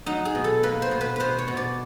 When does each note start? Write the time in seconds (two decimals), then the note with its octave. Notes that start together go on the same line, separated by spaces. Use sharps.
0.06 F#3 D#4
0.25 G#4
0.35 B2
0.44 A4
0.63 A#3 B4
0.82 C5
0.91 B2
1.01 B4
1.16 B2 B4 C5
1.38 C#5
1.48 B2
1.57 D5